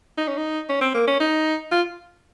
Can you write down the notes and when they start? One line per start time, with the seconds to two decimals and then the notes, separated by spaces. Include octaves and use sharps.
0.17 D#4
0.28 C#4
0.38 D#4
0.69 C#4
0.81 C4
0.94 A#3
1.07 C#4
1.20 D#4
1.72 F4